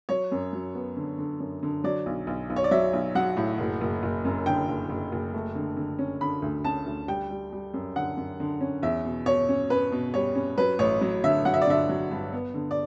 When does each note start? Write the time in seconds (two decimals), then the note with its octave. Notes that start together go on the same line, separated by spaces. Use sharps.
0.09 F#3 C#5
0.32 F#2
0.53 F#3
0.75 B3
0.97 D3
1.18 D3
1.40 F#2
1.63 D3
1.84 F#3 D5
2.06 B1
2.27 B1
2.50 B1
2.56 C#5
2.64 D5
2.71 F#3 E5
2.93 B1
3.15 F#3 F#5
3.37 A2
3.58 F#1
3.81 F#1
4.03 F#1
4.25 F#2
4.46 D3 G5
4.68 F#1
4.89 F#1
5.12 F#1
5.33 A3
5.55 D3
5.77 D3
5.99 C#4
6.21 D3 B5
6.42 D2
6.65 C#4 A5
6.86 D2
7.08 G3 G5
7.30 G3
7.53 G3
7.74 F#2
7.96 D3 F#5
8.17 F#2
8.40 D3
8.61 C#4
8.83 E2 E5
9.05 B2
9.26 B2 C#5
9.49 C#4
9.70 C#4 B4
9.92 B2
10.14 G3 C#5
10.35 C#4
10.58 F#3 B4
10.79 A1 C#5
11.01 F#3
11.24 D3 E5
11.45 F#3 F#5
11.54 E5
11.62 D5
11.67 D3 E5
11.89 F#3
12.11 G2
12.33 B3
12.54 D3
12.71 D5